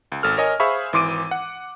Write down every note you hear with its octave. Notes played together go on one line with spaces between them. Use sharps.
C#2
G#1 A4 F6
A#4 C#5 D#5 G#5
G#4 C5 E5 F5 B5 C#6
G#1 E3 C6 D6 D7 D#7
F#5